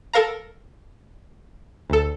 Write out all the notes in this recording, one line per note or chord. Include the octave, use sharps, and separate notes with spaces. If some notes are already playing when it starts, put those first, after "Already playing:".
A4 A#4 F5 A#5
D2 A4